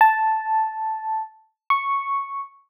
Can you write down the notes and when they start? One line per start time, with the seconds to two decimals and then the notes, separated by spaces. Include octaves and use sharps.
0.01 A5
1.70 C#6